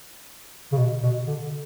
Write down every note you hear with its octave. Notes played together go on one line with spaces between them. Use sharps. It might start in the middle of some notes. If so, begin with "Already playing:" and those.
C#3
B2
B2
D3